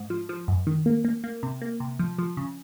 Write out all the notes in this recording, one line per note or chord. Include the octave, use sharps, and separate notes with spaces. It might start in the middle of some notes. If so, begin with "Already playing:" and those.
Already playing: G#2
F3
F3
F#2
D#3
A#3
A#3
A#3
C3
A#3
C3
F3
F3
C#3